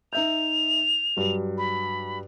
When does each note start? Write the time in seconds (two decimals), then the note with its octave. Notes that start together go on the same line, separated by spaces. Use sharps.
0.13 D#4 E5 G6 F7
1.17 G2 F#3
1.58 B5